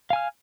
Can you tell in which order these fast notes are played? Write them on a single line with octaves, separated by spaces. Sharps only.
F5 G#5 F6